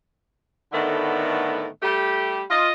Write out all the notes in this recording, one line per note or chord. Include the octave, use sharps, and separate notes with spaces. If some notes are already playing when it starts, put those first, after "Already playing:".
A2 D3 D#3 A3 B3
G3 A3 G4
F4 D#5